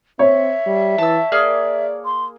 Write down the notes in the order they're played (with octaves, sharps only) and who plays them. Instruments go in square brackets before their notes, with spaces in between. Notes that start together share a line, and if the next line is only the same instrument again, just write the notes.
[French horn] C4 [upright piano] C#5 [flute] E5
[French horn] G3
[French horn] E3 [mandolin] A5 E6
[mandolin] A#3 G#4 F6 [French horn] D5
[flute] C6